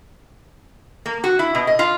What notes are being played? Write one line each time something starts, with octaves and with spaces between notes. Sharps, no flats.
A#3
F#4
E4
B2
D#5
F4